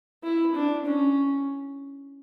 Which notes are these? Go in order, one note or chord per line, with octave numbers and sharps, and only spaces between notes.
E4
D4
C#4